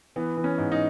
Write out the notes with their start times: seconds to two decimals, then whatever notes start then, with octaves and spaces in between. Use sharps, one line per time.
0.16 E3 B3
0.37 E3
0.44 C#4
0.58 G#2
0.72 D#4